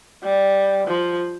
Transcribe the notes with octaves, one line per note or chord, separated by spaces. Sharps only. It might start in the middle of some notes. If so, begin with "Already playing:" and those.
G3
F3